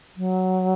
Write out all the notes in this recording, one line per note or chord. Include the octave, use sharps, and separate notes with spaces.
F#3